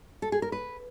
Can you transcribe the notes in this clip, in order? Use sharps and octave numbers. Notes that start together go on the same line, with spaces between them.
A4
G#4
A#4
B4